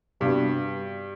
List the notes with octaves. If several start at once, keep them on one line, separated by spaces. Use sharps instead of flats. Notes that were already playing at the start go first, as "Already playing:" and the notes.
G2 C3 G3 B3 D4 F#4